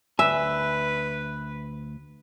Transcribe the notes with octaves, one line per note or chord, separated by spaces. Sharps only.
D2 B4 E5 G#5